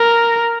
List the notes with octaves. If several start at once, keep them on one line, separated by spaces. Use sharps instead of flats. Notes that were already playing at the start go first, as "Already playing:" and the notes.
Already playing: A#4